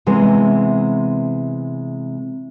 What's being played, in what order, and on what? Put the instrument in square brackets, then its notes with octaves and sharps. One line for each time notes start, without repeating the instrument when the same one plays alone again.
[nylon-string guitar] C3 E3 G#3 B3 C4